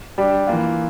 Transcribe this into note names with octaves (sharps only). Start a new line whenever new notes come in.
G3 D4 G4
E3 A#3 F4